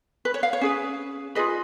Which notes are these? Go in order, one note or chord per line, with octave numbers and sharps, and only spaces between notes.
B4
C#5
F5
C#5
C#4 G#4 B4
F4 G#4 B4 D#5